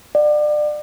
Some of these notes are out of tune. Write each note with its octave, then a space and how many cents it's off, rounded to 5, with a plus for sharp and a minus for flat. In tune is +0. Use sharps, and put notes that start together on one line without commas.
D5 +30 F#5 +0